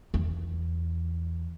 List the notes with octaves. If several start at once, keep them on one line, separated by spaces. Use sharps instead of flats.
E2